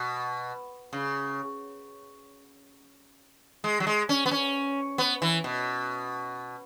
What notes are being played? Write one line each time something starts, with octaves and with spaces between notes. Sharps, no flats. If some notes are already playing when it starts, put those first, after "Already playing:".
Already playing: B2
C#3
G#3
F#3
G#3
C#4
B3
C#4
B3
E3
B2